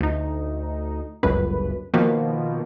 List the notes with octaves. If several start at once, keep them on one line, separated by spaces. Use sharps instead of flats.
D2 D#4
G1 C#2 F#2 B4
B2 D#3 F3 A#3